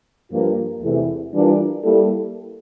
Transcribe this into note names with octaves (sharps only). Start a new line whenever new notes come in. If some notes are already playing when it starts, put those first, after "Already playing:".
G2 F3 A#3 F4 A#4
E2 C3 E3 A3 E4
E3 G3 D4 F4 A#4
G3 A#3 E4 A4